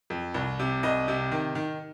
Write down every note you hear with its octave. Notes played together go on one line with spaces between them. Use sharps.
F2
C2
C3
C2 D#5
C3
D#3
D#3